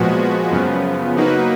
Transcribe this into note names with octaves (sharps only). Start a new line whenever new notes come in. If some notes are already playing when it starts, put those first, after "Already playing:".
Already playing: A#2 F3 G#3 B3 F#4
F#2 C#3 F3 B3
F#3 A#3 D#4 F#4 B4